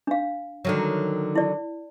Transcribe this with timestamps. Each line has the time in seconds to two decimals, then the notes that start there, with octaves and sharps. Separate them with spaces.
0.07 D4 F5
0.65 D3 D#3 F#3
1.35 E4 D5